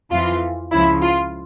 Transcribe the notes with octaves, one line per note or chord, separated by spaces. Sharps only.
F2 E3 F4
C#2 C#3 F3 E4
F4